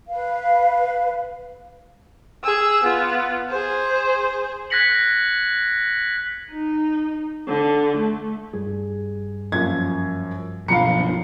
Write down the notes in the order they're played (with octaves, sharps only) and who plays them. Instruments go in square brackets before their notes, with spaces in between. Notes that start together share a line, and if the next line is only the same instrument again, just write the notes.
[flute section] B4 F5
[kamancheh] G#4 E6
B3 F4
G#4 C5
[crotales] F#6 G#6 A#6 B6 C#7 F#7
[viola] D#4
D3
A3
[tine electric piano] G2 G3 [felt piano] G#4
[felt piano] F#2 F3 A#3 [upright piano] G#6
[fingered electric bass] B1 B2 F3 [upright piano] F5 C#7 [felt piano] A#5 B5